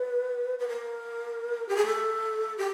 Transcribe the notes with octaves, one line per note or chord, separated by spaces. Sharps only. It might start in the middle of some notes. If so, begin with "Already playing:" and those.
Already playing: B4
B4
A#4
G4
G#4
A4
G4